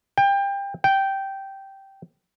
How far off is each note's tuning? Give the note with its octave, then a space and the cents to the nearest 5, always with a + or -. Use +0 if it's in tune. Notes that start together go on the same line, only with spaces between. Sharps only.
G5 +25
G5 -10